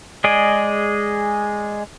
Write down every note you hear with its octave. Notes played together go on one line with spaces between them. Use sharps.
G#3 G#4 D5 D#5